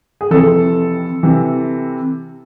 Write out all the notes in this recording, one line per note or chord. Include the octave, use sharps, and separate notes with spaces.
G#4
F2 C3 E3 A4
C3 E3